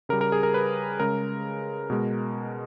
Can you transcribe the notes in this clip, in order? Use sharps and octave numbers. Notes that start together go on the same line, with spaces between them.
C#3 G3 A#4
A#4
G#4
A#4
B4
C#3 G#3 A#4
B2 G#3